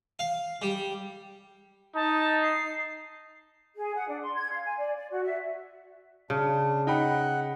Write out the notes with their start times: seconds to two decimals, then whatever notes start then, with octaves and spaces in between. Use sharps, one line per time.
0.19 F5
0.62 G3
1.95 D#4 A5
2.42 C7
3.75 G#4
3.94 F#5
4.08 D4
4.21 C6
4.35 G#6
4.51 F5
4.65 G#5
4.78 D5
4.96 D5
5.10 F#4
5.23 E5
6.30 C#3 D4
6.87 D#4 F#5 G5 B5